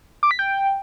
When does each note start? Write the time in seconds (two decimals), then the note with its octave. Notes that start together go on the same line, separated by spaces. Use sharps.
0.23 D6
0.31 B6
0.39 G5